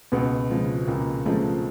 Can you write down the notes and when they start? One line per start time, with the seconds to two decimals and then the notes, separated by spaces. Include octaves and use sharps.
0.12 C#2 B2 B3
0.50 C#3 F3 G#3
0.87 C#2 A#2 A#3
1.26 C#3 F3 G#3 A3